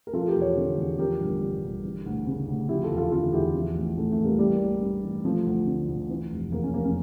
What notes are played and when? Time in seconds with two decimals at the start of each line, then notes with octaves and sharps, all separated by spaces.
0.07 A#4
0.13 F3 F4 A4
0.28 G4 A#4
0.36 E2
0.42 A4 C#5
0.57 D3
0.78 E2
0.98 F3 G4 A#4
1.20 G1
1.41 G2
1.63 G1
1.84 E3
2.06 D2
2.26 C#3
2.47 D2
2.69 F3 E4 G4
2.83 F4 A4
2.90 E2
2.97 F4 A4
3.11 D3 F4 A4
3.33 E2 E4 G4
3.54 F3
3.75 A1
3.97 A2 A3
4.11 A3
4.18 A1
4.24 G3 A#3
4.39 E3 G3 A#3
4.60 A1
4.82 G2
5.03 A1
5.25 F3 A3
5.46 D2
5.67 D3
5.88 D2
6.09 E3
6.30 F1
6.52 E2 A#3
6.63 C#4
6.73 F1 A#3
6.85 C#4